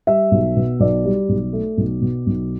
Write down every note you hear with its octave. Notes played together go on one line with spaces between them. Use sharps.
G3 E5
B1
B2
B1 D5
G3
B1
A3
B1
B2
B1